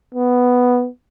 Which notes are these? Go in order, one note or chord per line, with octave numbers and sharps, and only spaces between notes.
B3